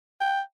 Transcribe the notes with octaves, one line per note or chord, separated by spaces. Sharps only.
G5